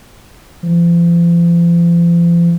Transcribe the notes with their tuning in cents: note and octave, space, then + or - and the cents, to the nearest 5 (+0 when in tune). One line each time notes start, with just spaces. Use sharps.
F3 -40